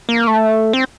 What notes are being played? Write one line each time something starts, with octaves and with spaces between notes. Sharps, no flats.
A#3
A3
C4